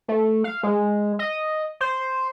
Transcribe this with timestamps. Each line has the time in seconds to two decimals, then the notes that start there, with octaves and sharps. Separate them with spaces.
0.08 A3
0.44 F5
0.63 G#3
1.19 D#5
1.80 C5